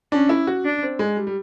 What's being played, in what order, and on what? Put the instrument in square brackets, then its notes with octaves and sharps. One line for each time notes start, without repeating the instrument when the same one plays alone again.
[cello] C#4 [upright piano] D4
[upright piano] E4
F#4
[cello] D4
[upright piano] C4
G#3
G3
G3